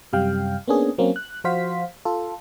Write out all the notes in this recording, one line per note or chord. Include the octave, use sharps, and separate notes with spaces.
F#2 C3 G3 F5 G5
A#3 B3 C#4 D4 G#4
F#3 A#3 C4 C#4
F#6
F3 F#4 C5 F5 B6
F4 A4